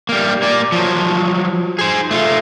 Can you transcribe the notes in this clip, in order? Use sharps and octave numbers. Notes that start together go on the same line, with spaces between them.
G3 A#3
A#3 D5
F3 F#3
G#4 C5
A3 F4